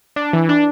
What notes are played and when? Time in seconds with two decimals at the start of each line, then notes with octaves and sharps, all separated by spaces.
0.16 D4
0.33 E3
0.49 D4